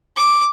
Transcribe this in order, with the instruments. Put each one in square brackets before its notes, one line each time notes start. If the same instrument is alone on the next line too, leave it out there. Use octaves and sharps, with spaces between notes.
[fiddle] D6